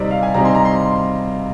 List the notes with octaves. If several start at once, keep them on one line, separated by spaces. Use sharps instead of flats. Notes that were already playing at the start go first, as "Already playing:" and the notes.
Already playing: C3 G3 C4 D#4 D5
F5
G#5
C3 G3 C4 D#4 A#5
C6
A#5
C6